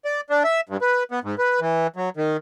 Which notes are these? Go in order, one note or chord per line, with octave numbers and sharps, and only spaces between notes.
D5
D4
E5
G2
B4
B3
G#2
B4
E3
F#3
D#3